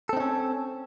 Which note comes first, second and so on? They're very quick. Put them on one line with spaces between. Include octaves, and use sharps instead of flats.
A4 C4 D#4 C#4